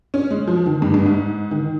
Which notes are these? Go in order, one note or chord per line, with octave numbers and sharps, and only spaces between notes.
C#4
G#3
F3
D#3
G2
G2
G#2
D#3